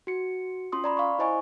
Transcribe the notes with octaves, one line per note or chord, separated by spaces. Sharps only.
F#4 C#7
C#4 F4 C6 D#6
D5 A#5 B5
F5 C#6
E4 C5 D#5 G#5 C#6